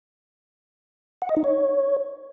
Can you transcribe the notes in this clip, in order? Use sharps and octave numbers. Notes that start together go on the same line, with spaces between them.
F#5
D#5
D#4
C#5